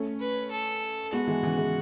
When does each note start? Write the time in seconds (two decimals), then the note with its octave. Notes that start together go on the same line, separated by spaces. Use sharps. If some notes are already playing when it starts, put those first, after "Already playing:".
Already playing: A3 C#4
0.20 B4
0.51 A4
1.13 G#3 B3 F#4
1.27 E3 G#3
1.43 C#3 E3
1.58 E3 G#3